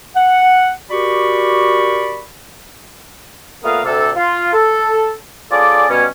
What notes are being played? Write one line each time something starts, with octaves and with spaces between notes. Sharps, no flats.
F#5
F#4 G4 A#4 D5 B5 C#6
A#2 A3 B3 A#4 F5 D#6
D2 C3 A4
F4
A4
C#4 F4 G#4 A4 D5
B2 G3 C#4